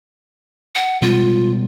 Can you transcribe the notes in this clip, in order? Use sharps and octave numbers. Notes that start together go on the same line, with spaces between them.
F#5
B2 G3 G#3 F4